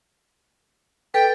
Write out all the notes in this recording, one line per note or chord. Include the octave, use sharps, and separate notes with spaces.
A4 B4 G5